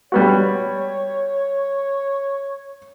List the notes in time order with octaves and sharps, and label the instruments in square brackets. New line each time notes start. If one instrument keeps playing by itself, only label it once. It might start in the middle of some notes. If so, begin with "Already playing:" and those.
[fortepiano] G3 B3 F#4 [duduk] C#5